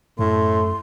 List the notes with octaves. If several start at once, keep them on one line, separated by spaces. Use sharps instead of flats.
F#2 A2 A3 C6